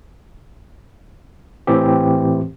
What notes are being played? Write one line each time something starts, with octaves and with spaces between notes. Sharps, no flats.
A2 E3 C4 G4